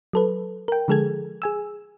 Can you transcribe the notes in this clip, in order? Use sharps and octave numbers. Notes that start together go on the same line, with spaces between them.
F#3 A4 B4
A#4 G5
D3 F3 G#3 G#4 A4 G#6
G#4 G#5 E6